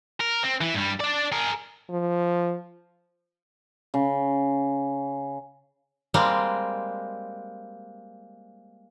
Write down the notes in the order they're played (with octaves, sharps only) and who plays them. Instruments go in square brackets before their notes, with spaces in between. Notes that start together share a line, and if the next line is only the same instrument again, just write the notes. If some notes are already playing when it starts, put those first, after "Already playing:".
[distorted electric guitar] A#4
C4
E3 E4
G2 G3
D4 D5
G#4 A#4
[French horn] F3
[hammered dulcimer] C#3
[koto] G3 G#3 A#3 C4